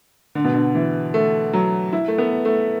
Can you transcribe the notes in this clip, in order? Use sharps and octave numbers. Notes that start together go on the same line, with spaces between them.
D3
B2
D3
E3
A3
F#3
E4
A3
B3
A3